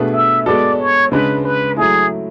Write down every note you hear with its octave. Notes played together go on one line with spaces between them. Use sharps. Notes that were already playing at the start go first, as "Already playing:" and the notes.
Already playing: B2 A3 D4 G#4 B4
E5
G#3 B3 F#4 A4 D5
C#5
C#3 G#3 D4 B4
B4
F#3 A3 E4 G#4